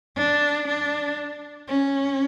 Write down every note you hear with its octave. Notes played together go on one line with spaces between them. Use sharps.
D4
D4
C#4